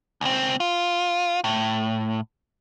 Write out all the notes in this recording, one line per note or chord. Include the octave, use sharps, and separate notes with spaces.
C#2 C4
F4
A2